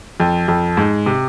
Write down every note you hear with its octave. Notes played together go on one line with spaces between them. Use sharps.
F2
F2
G#2
C3